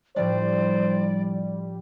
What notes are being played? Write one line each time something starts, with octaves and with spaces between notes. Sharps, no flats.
A2 F3 G3 D4 C5 D5